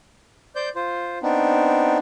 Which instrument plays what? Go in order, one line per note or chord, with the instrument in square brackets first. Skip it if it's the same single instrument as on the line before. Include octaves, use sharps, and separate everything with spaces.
[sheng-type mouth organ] C5 D5 G6
F4 C5
B3 C4 D4 D#4